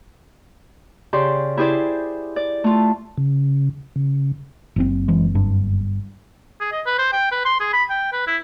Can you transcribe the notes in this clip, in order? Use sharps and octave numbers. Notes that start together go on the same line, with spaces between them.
C#3 G4 D5 C6
E4 G4 G#4 C5 D5
D5
A3 F4
C#3
C#3
F#1 C3 C4
E3 G#3
G1 G2 D4
G#4
D#5
B4
C5
G5
B4
C6
G#4
B5
G5
B4
E4